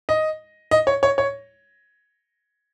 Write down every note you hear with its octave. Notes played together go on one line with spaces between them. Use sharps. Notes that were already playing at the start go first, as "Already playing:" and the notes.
D#5
D#5
C#5
C#5
C#5